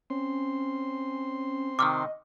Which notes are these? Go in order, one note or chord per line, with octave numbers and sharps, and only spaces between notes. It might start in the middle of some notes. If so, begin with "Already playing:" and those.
C4 C#4 C6
C3 D#3 D#5 D6 F6